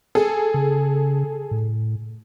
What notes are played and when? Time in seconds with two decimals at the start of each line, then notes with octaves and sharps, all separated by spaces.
0.15 G#4 A4
0.54 C#3
1.51 A2